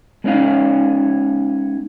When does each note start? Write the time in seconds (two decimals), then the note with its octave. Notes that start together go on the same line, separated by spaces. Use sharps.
0.24 G#3 B3 C#4 D#4 F5